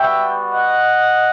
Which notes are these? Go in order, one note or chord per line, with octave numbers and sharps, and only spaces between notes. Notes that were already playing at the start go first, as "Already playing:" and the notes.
Already playing: G3 B3 F#4 E5 G5
D#5 F#5